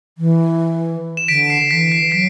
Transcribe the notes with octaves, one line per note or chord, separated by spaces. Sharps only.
E3
E7
D3 B6 D7
C7
E3 B6
C7
F#3 B6 D7